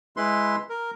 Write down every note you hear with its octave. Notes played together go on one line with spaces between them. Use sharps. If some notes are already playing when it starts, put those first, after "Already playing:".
G#3 E4 B4 C6
A#4